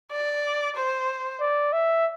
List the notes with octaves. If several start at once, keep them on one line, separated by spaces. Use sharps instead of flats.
D5
C5
D5
E5